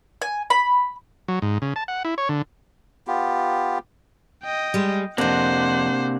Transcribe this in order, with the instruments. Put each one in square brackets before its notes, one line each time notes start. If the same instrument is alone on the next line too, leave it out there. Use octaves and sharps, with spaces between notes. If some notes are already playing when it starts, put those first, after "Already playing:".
[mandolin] G#5
B5
[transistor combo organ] F#3
G#2
C#3
A5
F#5
E4
C#5
D3
[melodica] B3 F4 G4
[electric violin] D#5 G5
[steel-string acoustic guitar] G3 G#3
[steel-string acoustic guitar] F2 F3 [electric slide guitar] C3 A#3 D4 [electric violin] C5 F#5